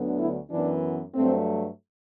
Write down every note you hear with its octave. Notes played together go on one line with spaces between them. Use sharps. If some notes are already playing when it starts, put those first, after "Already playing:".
Already playing: D2 D3 F#3 B3
E4
F#2 E3 B3 D4
G2 F#3 A3 C4